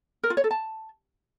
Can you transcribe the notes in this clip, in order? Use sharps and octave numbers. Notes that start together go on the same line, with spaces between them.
A#4
F4
C#5
A4
A5